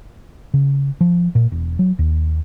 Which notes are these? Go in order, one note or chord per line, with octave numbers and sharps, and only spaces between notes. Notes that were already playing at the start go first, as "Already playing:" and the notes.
C#3
F3
A#2
E1
F#3
D#2